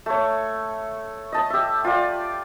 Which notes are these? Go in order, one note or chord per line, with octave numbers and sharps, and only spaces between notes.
A3 C#5
D#5 A5
G4 E5
F4 D5